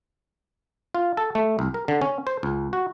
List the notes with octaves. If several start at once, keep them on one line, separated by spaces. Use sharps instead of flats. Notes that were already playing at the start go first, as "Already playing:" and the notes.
F4
A4
A3
C2
A#4
D3
C#4
C5
C#2
F#4